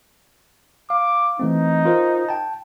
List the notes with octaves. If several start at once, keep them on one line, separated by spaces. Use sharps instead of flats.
F5 D6
E3 A3 C4 D#4
F4 A#4 C5
G5 A5